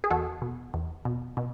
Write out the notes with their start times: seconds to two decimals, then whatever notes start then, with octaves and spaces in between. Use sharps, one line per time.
0.04 G#4
0.10 E2 F#4 A4
0.42 B2
0.74 E2
1.05 B2
1.37 B2